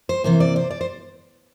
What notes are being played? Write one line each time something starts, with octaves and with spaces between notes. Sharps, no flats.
C5
C3 E3 A#3 C5
D5
C5
D5
C5